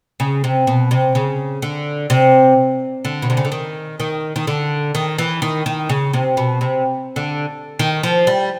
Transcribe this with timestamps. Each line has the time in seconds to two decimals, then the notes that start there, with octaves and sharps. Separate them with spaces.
0.20 C#3
0.44 C3
0.67 B2
0.91 C3
1.15 C#3
1.62 D3
2.10 C3
3.05 D3
3.22 B2
3.30 C3
3.37 C#3
3.45 D3
3.52 D#3
4.00 D#3
4.36 D#3
4.47 D3
4.95 D#3
5.18 E3
5.42 D#3
5.66 D#3
5.89 C#3
6.13 C3
6.37 B2
6.61 C3
7.16 D3
7.79 D#3
8.03 F3
8.27 G3